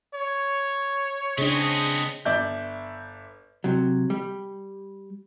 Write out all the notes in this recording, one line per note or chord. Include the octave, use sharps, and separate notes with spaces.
C#5
C#3 B3 C4 D4 G#4 C5 D#5
G1 D5 E5 G6
C3 F#3
G3